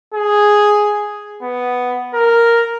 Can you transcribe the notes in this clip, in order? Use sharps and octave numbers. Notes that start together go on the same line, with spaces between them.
G#4
B3
A#4